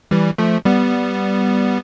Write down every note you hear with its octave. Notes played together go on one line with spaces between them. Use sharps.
E3 G3
F3 A3
G3 B3